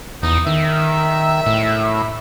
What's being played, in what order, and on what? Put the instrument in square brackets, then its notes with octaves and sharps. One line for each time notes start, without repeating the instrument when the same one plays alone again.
[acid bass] E2 [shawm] D#4
[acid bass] D#3 [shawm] E5
[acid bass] A2